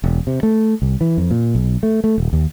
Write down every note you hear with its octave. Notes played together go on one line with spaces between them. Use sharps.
E1
C3
A3
C2
E3
F2
A#2
B1
A3
A3
D#1
D#2